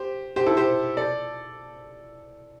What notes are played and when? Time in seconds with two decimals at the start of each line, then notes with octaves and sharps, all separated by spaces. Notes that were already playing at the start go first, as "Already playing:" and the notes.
Already playing: G4 C5
0.36 G4 C5
0.46 E4 A4
0.57 G4 C5
0.97 A4 D5